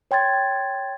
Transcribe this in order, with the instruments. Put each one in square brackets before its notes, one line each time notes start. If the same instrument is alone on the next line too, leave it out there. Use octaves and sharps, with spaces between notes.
[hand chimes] C#5 G5 C6 G#6 A6